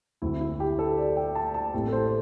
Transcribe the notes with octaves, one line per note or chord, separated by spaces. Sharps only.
D2 D3 C4 E4
E4
G4
A4
D5
G5
A5
A5
A1 A2 A3 C4 G4
A4
C5